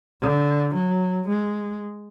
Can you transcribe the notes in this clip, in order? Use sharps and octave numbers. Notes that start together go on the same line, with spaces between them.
D3
F#3
G#3